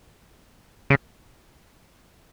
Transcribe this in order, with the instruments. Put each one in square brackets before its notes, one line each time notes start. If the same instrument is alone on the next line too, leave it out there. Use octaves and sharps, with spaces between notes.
[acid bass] C#3